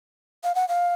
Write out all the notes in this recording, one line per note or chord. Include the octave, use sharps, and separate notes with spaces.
F5
F#5
F5